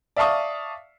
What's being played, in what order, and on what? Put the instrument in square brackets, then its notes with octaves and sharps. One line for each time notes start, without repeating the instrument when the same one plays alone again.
[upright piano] D5 E5 F5 A5 C#6 D#6